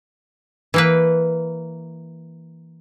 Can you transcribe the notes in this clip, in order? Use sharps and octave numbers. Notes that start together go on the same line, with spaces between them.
E3 A#3 B4